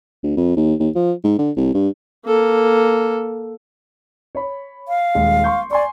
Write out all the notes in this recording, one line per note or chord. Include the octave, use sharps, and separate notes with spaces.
D2
F2
D#2
D#2
F3
G#2
D3
C2
G2
A#3 A4
C#5 B5
F5
D#1 G#3
C6 C#6 G6
D5 G#5 C6 C#6